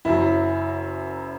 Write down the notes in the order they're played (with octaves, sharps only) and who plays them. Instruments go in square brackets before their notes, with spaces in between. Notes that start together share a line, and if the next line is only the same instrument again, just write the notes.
[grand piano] F#1 F#2 F#3 [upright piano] E4